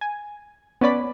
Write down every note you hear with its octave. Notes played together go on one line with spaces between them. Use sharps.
G#5
B3 C#4 D5 B5